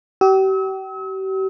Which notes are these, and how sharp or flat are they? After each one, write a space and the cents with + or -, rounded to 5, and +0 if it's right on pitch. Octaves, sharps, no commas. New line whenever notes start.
G4 -40 E6 -45